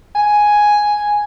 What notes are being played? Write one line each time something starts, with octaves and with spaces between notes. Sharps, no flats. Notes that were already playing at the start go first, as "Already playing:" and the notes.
G#5